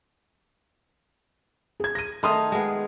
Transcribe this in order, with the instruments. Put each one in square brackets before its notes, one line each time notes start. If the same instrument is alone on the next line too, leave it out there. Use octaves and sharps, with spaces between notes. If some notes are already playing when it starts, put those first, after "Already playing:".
[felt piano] G#4 G#6
A#6 D#7
[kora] D#3 A3 D#4 [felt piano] A5 C6 D#6
[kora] G#3 B3